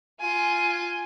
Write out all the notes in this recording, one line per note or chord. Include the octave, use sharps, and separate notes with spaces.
F4 G#5